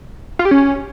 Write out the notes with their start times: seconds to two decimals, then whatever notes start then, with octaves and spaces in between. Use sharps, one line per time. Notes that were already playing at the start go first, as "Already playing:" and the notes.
0.39 F4
0.45 G4
0.51 C#4